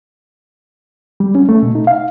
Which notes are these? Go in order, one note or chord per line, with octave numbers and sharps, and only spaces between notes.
G3
C#4
A3
B2
D#4
F5